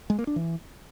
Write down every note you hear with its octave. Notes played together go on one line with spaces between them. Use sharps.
G#3
A#3
D4
E3